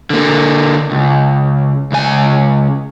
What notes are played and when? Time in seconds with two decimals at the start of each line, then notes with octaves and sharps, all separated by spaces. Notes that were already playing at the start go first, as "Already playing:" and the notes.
0.10 D3 A#3
0.91 C#2
1.92 C#2 G#5